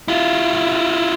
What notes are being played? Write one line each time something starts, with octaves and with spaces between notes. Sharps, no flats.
E4 F4